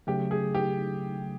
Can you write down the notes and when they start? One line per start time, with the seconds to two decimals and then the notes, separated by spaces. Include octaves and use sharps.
0.07 C#3 F#3 A3 G4
0.31 G#4
0.54 G4